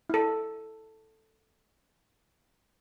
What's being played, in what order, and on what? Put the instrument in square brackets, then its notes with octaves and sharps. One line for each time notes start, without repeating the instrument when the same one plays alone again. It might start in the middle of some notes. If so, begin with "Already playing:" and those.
[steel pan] E4 A4